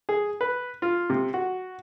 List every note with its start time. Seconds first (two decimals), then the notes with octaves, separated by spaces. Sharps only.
0.09 G#4
0.41 B4
0.82 F4
1.10 C3
1.34 F#4